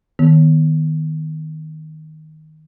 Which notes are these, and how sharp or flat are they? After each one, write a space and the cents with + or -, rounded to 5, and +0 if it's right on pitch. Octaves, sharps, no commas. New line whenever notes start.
D#3 +0 B3 +0